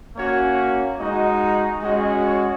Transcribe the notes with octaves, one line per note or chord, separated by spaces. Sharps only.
A#3 C#4 F#4 C#5
G#3 D#4 F#4 D#5
G#3 C#4 F#4 D#5
C#5